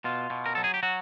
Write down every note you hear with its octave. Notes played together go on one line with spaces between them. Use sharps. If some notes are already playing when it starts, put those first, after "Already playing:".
B2 F4
B2
A#4
F#3 A4
G#4
G4
F#3 F#4